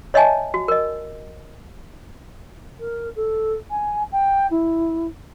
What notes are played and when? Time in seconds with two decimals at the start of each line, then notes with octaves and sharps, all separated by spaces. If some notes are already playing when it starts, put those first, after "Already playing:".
0.14 C#5 D#5 E5 G#5 A5
0.54 F#4
0.68 A#4 D#5
2.80 A#4
3.16 A4
3.70 G#5
4.12 G5
4.51 E4